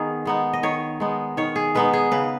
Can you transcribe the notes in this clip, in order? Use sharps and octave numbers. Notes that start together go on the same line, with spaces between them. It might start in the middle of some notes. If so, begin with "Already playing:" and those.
Already playing: D#3 B3 D#4 G#4
G#3 B3 D#4
D#5
D#3 C#5
G#3 B3 D#4
D#3 C#5
G#4
G#3 B3 D#4 B4
G#4
C#3 B4